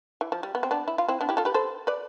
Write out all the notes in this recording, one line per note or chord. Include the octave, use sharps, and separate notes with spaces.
E3
F3
G3
B3
C4
B3 D4
E4
F4
C4 E4
B3 D4
E4 G4
F4 A4
G4 B4
A4 C5
B4 D5